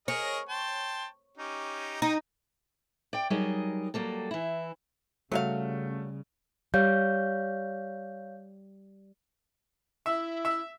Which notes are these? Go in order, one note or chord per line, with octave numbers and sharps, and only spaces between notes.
G#4 A#4 C#5 D#5
G5 A5 C6
C#4 D#4 G4
D#4 D#5 G5
D5 G5
F#3 G3 D#4 G#4 A#4 D#5
F#3 G3 A#3 A4
E3 E4
C#3 F#3 G3 A3 F#4 F5
G3 C#5 F5 G6
E4 E5
E5